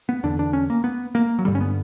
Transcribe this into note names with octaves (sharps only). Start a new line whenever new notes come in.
B3
E2 D3 D4
D4
C#4
A#3
B3
A#3
F#3
G2 D3 G3
C#4
B3